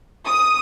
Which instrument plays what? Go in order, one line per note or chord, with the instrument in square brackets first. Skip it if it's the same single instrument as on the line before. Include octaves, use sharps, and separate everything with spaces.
[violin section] D#6